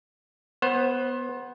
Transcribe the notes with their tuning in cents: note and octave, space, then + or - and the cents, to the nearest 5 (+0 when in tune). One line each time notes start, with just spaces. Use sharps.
B3 +0 C5 +25